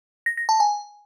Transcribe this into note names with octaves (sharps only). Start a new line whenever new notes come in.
A#6
A#6
A5
G#5